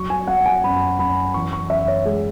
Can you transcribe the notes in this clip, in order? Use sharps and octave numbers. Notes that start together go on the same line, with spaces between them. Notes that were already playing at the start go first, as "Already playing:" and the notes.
Already playing: F#3 C#6
G#5
F#3 F#5
G#5
F#2 B5
F#2 B5
E3 C#6
C#6
F#2 E5
C#5
G#3 G#4